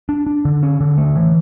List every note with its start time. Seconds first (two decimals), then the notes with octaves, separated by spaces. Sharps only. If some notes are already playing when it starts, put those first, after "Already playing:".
0.09 D4
0.27 D4
0.45 D3
0.63 C#4
0.81 D3
0.98 A3
1.15 E3